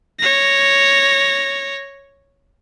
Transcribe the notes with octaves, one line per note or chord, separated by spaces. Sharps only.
C#5 A#6